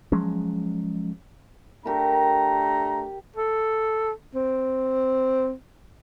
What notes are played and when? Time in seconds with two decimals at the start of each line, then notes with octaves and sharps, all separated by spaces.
0.12 F3 F#3 G#3 C#4
1.86 A3 D4 G4 A#4 A#5
3.36 A4
4.35 C4